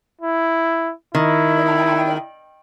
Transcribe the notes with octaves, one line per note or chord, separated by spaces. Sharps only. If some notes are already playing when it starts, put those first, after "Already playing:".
E4
D#3 E4